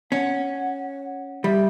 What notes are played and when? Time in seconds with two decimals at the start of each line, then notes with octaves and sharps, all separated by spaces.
0.12 C#4 F#5
1.44 G3 E5